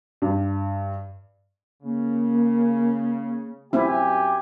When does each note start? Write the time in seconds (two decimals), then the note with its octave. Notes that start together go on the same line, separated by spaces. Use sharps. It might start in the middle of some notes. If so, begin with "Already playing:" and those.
0.22 G2
1.83 C#3 A#3
3.73 F#2 C4 E4 G4 E5 G#5